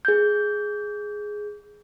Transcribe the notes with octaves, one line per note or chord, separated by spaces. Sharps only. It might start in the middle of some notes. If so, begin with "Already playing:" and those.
G#4 G6